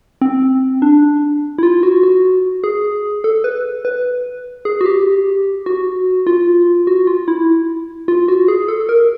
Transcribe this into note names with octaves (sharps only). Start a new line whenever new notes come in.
C4
D4
E4
F4
F#4
F#4
G#4
A4
B4
B4
G#4
F#4
G4
F#4
F4
F#4
F4
E4
F4
F#4
G#4
A4
A#4